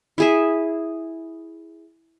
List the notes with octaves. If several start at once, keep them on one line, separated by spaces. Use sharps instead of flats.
E4 G#4 E5